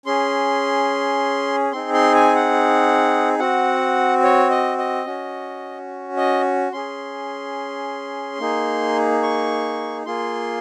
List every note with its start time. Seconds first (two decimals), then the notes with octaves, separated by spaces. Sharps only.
0.06 C#4 G#4 C6
1.72 C4 D#4 G#4 C6
1.94 C6
2.15 G#5
2.35 F#5
3.39 C4 F#4 F#5
4.23 C#5
4.50 D#5
4.78 D#5
5.06 C#4 F#4
6.17 D#5
6.73 C#4 G#4 C6
8.39 A#3 D#4 G#4
9.23 C#6
10.06 A#3 F4 G#4 C6